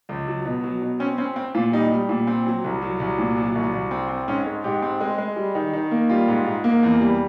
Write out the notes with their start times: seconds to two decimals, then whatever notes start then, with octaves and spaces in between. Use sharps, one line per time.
0.09 C#2
0.27 F#3
0.45 B2
0.64 F#3
0.82 B2
1.00 C4 C#4
1.18 C4 C#4
1.36 C4
1.54 A#2 F4
1.72 G3 D#4
1.91 G3
2.09 A#2
2.27 C4
2.46 F#3
2.64 C2
2.82 F#3
3.00 C2
3.19 A#2
3.37 F#3
3.55 C2
3.73 C2
3.91 C4
4.09 C4
4.28 G#2 C#4
4.46 G#3
4.64 G#2 G4
4.82 C4
5.01 G#3
5.18 G#3
5.36 G3
5.55 D#3
5.73 D#3
5.91 A#3
6.10 G3 F4
6.28 G#2
6.46 G#2
6.64 A#3
6.83 E2
7.01 G3